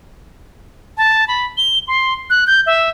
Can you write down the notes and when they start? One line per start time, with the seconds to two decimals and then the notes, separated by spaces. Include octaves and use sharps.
0.97 A5
1.28 B5
1.57 G7
1.88 C6
2.30 F#6
2.47 G6
2.66 E5